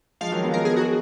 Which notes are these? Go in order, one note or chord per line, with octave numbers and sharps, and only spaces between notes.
F3 G#3 F5
D#3 F#3
G#3 B3
A#4
G#4
F#4